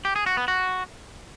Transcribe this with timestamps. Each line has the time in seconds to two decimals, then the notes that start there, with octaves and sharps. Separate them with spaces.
0.05 G4
0.16 G#4
0.26 F#4
0.37 B3
0.48 F#4